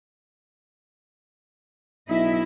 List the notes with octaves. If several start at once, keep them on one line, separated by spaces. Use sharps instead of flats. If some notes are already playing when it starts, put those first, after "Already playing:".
B1 E4 D#5 E5